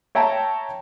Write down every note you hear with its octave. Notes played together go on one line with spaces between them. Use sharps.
C#5 E5 G5 A5 A#5